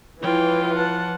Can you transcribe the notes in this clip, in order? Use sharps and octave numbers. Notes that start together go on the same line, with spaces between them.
E3 F3 F4 C#5 G5
F#5 A5